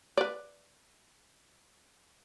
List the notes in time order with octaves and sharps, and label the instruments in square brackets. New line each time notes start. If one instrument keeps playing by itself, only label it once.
[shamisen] B4 D5